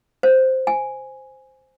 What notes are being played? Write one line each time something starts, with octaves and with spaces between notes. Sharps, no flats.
C5
G#5